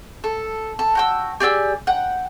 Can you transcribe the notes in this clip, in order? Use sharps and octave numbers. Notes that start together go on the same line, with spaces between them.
A4
A4
F#4 G5 E6
G4 G#4 D5 E6
F#5 G5